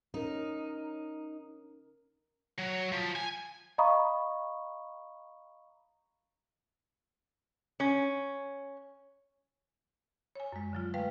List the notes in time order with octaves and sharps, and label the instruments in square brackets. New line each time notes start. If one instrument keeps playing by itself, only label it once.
[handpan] C#4 A#4 [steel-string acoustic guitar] D#4
[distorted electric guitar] F#3
F3
G#5
[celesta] D#5 F5 A#5 B5 C#6 D#6
[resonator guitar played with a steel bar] C#4
[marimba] C#5 G#5
F#2 G#3
D3 F#3 F4
G#3 A3 B4 F5 G5